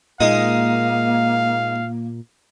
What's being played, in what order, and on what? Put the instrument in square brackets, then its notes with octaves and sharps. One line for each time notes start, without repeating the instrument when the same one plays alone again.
[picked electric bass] A#2 [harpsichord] G#3 D#4 [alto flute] A#3 [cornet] F5